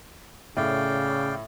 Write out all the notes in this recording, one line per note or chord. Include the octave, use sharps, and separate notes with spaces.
A2 C#3 D5 F5 G5